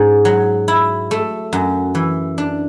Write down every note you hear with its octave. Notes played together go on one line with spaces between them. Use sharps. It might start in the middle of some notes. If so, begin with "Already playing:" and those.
Already playing: G#2 C#4
F#3
E4
A3
F#2
E3
D4